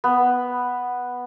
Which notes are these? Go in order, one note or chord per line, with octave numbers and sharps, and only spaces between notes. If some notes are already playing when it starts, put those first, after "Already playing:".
B3